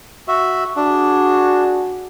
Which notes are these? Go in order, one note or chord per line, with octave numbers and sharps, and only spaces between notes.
F#4 E5
D4 F#4 G#4